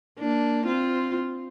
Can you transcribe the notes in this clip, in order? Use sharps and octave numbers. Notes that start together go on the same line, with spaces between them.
A#3 D4
C4 F4